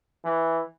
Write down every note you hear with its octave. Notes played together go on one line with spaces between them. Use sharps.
E3